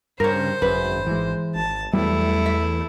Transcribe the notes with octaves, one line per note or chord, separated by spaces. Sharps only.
G2 C#3 A#4 C5 C#5
G#1 F#2 C#3 B4
E3 G#3
G#1 A5
E2 F#3 G3 A3 B3 E4
E5